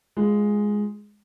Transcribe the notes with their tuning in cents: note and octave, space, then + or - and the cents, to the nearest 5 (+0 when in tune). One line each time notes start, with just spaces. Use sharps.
G#3 +0 F4 +0